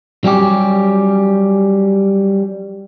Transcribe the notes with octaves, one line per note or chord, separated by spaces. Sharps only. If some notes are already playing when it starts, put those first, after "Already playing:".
F#3 G3 C#4 G4